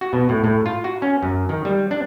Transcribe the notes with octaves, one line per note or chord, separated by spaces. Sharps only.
F#4
B2
A2
A2
F4
F#4
C#4
F#2
D#3
G3
D4